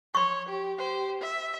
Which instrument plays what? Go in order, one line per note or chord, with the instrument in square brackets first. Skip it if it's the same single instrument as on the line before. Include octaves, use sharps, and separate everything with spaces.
[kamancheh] C#5 [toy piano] C6 C#6
[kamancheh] G4
G4 C5
E5